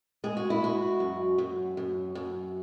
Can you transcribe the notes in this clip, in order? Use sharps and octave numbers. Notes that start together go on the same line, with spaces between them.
G#3 G#4
F#4
E4
G#3 F#4
F#2
F#2
F#2
F#2